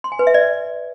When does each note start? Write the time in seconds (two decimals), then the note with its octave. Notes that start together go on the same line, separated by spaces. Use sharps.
0.04 C6
0.12 G#5
0.19 B4
0.27 E5
0.34 D5